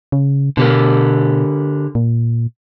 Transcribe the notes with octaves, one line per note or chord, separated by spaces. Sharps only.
C#3
B2 D3 G4 A#4
A#2